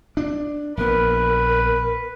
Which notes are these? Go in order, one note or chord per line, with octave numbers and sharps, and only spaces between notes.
D4
A#1 B3 A#4 B4